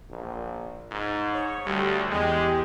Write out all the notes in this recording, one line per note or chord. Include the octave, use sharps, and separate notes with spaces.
A#1
G#2
C#5
D2 G3
E2 G#3 G4